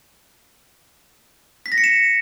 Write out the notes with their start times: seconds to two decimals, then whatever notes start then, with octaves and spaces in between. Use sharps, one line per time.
1.66 B6
1.72 A#6
1.78 C#7
1.84 E7